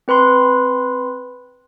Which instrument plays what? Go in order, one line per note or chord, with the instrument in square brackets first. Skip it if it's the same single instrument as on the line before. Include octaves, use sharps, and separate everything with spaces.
[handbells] C4 B4 B5 C6